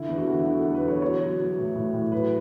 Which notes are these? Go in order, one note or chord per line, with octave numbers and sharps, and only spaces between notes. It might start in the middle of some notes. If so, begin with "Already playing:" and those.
Already playing: D3 E4
E2
F#4
D3
E4
F#3 F#4
A4
F#3
B4
E2
C#5
F#3 C#5
F#3
F#3
A2
A2
A2
F#3 B4